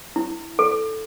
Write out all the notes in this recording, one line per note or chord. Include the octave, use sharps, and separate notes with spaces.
E4
A4